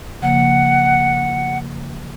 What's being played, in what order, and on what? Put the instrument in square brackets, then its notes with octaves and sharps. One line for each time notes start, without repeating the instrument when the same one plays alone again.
[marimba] C#3 F3 A#3 [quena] F#5